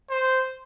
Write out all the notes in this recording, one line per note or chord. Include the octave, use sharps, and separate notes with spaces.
C5